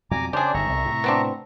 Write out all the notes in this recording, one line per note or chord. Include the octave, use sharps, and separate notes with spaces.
F2 B2 G3 G#5 A#5 D6
C#3 D4 G4 G#4 C5 D5
G1 D#3 E5 A#5 C#6
C2 B2
A2 C3
B3 C4 D4